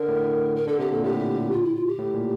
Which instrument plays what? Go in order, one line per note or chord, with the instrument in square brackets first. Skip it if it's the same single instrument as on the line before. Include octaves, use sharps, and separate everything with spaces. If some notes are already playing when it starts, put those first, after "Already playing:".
Already playing: [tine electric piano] D3 [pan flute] A#4
[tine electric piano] A2
[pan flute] A#4
[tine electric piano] D3 [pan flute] A4
[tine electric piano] C3 [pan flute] G4
[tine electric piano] A#2 [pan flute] A4
[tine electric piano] A2 [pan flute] G4
[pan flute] F4
E4
F4
G4
[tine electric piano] A2
A#2